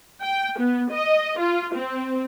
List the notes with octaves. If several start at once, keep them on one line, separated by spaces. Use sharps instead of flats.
G5
B3
D#5
F4
C4